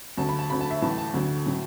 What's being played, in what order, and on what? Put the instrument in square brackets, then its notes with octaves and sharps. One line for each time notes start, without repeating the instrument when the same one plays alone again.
[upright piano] D2 D3 F#3 A5
B5
A5
D2 D3 F#3 B5
A5
E5
A1 A2 E3 A5
A5
D2 D3 F#3
A2 F#3